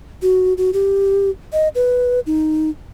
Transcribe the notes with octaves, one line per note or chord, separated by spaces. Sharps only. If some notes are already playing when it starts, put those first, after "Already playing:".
F#4
F#4
G4
D#5
B4
D#4